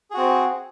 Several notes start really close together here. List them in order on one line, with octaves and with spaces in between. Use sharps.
G#4 F#4 C4